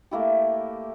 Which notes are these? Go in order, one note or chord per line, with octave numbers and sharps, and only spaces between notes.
A3 A#3 E4 G4